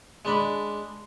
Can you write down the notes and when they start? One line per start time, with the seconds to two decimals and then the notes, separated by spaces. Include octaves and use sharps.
0.25 G#3 D4 B5